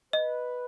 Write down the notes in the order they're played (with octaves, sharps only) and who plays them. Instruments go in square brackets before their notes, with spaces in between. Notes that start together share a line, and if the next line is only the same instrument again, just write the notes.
[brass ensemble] B4 [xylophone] D#5